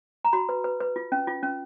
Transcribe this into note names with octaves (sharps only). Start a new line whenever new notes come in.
A#5
F#4 B5
B4
B4
B4
F4
C#4
F4
C#4